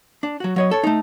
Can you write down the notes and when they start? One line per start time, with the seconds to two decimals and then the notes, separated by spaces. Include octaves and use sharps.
0.23 D4
0.40 F#3 F#4
0.56 F#3 C#5 D#5
0.71 A4 C#5
0.84 A3 D#4